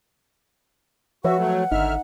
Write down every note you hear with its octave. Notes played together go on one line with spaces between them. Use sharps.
F3 F#4 B4 C#5 E5 F#5
F#3 A3
G#1 D3 D#4 E5 F6